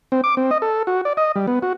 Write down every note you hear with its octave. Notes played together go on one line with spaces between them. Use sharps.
C4
D6
C4
D#5
A4
F#4
D5
D#5
G3
B3
F#4